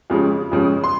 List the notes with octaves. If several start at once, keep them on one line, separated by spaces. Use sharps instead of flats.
F2 C#3 G#3
F2 C#3 G#3
C6